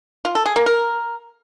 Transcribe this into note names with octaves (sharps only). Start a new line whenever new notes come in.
F4
A4
G#4
A#3
A#4